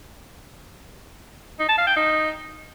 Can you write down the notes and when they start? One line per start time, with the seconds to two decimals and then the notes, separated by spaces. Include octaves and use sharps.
1.60 D#4
1.69 A5
1.78 F5
1.87 G5
1.96 D#4